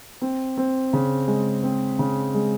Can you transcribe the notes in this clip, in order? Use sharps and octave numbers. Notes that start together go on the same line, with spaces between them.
C4
C4
C#3
G#3
C4
C#3
G#3